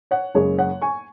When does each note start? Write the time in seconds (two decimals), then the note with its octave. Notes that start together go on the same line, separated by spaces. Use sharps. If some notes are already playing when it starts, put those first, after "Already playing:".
0.11 C#5 F#5
0.34 F#1 F#2 C#3 G#3 G#4 C#5
0.58 C#5 F#5
0.82 G#5 C#6